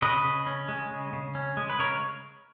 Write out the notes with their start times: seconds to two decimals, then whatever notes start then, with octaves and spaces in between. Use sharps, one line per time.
0.02 C#3 B4 D#5
0.25 C#3
0.46 C#4
0.69 G#3
0.91 C#3
1.13 C#3
1.35 C#4
1.57 G#3
1.70 B4
1.79 C#3 A#4 C#5